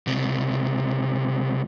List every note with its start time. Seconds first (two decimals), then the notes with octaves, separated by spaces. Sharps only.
0.07 C#2 C3